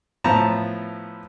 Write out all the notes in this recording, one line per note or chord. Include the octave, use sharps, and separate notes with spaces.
A2 F3 B3 A5 A#5